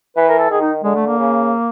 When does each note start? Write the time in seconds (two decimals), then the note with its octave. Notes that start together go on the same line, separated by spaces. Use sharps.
0.16 E3 B4
0.29 A#4
0.39 A4
0.50 D#3 G#4
0.61 D#4
0.84 D3 G#3
0.95 A3
1.06 A#3
1.18 C#3